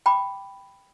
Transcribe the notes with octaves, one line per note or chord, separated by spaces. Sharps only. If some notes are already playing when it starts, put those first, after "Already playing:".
G5 B5 D6